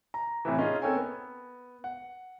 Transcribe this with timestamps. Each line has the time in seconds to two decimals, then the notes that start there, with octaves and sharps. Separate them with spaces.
0.14 A#5
0.45 A2 C3 E3
0.58 C#4 D#4 F4 G#4
0.82 C4 A4 A#4 C#5 G5 G#5
0.96 B3
1.84 F#5